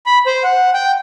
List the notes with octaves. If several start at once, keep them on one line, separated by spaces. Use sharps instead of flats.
B5
C5
F#5
G5